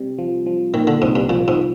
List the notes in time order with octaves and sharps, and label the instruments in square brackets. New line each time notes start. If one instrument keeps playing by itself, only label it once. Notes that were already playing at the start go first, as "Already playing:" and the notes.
Already playing: [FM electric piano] C3 G3
F3
F3
[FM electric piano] A#2 [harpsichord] D#3
[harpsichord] D3
[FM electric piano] C2 [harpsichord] G#2
[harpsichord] G2
[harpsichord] A#2 [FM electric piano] F3
[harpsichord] G#2
[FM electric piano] F3